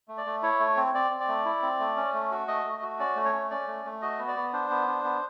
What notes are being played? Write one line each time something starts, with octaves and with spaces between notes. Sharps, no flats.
A3
D5
A3
E4 C#5
A3
C4
C4 D5
C4
D5
A3
E4
C4
A3
C#4
A3
F#4
A3 D#5
A3
F#4
C#4 D5
A3
C#5
C#4
C#4 D5
A3
A3
F#4 D#5
B3
D5
B3
D4 C5
B3
D4
B3